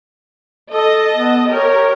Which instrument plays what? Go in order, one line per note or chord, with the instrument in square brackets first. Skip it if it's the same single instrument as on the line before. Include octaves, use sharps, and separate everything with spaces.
[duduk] A4 [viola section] D#5 A5
[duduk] B3
[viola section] G4 A#4 [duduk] C#5